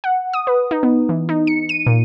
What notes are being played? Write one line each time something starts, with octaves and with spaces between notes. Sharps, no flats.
F#5
D#6
B4
D#4
B3
E3
D#4
C#7
D#7
A#2